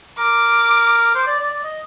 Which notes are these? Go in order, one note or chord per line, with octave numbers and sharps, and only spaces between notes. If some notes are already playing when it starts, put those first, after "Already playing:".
A#4 D6
C5
D5
D5
D5
D#5